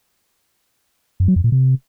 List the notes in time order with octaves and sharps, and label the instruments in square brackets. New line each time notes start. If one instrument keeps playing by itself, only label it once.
[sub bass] F#2
F#3
F2
A#2
C3